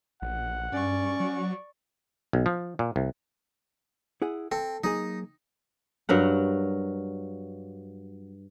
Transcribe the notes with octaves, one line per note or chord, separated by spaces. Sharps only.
A#1 F#5
G2 C#4 D5 C#6
F#3 F#4
B1
F3
A#2
C2
E4 G#4 F#5
C4 A4
F#3 A#3 D#4 G#4
G2 F#3 A#4 F#5